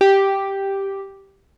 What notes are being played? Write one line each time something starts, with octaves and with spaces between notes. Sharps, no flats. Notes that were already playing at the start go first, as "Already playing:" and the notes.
G4